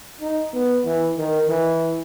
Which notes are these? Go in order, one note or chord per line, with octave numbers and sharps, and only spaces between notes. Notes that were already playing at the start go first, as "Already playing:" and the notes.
D#4
B3
E3
D#3
E3